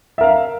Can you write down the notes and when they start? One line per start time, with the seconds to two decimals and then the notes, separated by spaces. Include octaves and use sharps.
0.18 E5
0.21 A#4
0.23 F5